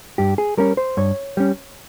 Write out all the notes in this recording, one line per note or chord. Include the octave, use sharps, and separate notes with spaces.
G2 G4
G#4
G3 C#4 A#4
C5
G2 C#5
G3 C#4